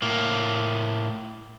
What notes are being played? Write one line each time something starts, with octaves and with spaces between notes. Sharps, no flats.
A2 A#3